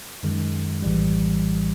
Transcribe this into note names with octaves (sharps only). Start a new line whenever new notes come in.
F#2 D#3 G#3
A#1 A2 E3 G3